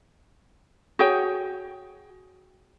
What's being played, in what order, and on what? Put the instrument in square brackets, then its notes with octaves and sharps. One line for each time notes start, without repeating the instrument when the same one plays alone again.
[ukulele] F#4 G#4 C#5 G5